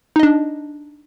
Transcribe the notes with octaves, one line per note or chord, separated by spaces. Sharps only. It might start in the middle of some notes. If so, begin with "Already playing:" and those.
D4 D#4 D#5